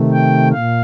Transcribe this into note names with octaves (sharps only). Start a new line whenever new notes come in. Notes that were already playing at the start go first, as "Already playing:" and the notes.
Already playing: C3 D#3 A3
G5
A#2 F5